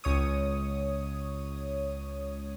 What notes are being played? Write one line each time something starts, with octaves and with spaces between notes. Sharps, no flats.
C#2 C#5 D#6